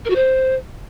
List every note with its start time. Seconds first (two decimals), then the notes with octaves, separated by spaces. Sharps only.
0.05 A#4
0.10 F#4
0.15 C5